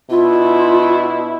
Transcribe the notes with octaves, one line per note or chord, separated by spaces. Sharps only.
B2 D4 E4 F4